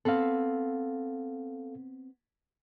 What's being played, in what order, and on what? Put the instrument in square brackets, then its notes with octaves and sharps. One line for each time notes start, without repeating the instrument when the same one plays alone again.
[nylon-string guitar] B3 C4 B4 [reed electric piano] A4 F5